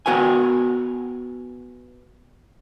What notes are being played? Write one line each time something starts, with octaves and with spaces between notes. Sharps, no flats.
B3 F#4 A#4 G5 G#5